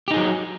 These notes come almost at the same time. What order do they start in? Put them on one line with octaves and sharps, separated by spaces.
G4 D#4 G#4 F#3